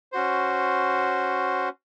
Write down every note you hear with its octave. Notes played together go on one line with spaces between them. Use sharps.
C#4 F#4 C5